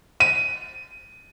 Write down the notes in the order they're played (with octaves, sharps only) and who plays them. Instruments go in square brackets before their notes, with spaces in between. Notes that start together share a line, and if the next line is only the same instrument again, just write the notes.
[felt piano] D#7